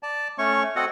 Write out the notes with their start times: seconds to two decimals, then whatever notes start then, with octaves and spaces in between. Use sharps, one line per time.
0.03 D5 A5
0.38 A3 C#4 C#5 C#6
0.76 C4 F#4 A4 D#5 F#5